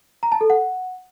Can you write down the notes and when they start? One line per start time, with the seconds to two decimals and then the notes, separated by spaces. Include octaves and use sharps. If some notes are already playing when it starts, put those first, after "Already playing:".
0.23 A#5
0.32 A5
0.41 A4
0.50 F#5